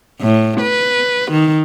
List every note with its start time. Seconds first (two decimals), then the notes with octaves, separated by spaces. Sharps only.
0.21 A2
0.61 B4
1.31 D#3